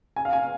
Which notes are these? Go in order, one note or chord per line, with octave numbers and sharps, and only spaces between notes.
G#5
F5
G#5